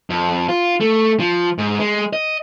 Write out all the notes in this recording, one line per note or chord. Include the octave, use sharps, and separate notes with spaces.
F2
F4
A3
F3
G#2
G#3
D#5